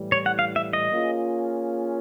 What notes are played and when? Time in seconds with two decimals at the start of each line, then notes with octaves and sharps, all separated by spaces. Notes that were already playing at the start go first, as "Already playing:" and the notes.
Already playing: A2 E3 G3
0.12 C#5
0.26 F#5
0.39 F5
0.56 E5
0.73 D#5
0.90 A#3 C#4 F4 G#4